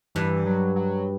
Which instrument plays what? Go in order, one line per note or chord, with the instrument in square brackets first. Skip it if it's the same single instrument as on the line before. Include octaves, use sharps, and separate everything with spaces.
[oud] G2 [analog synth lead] E3
[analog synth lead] F#3
F#3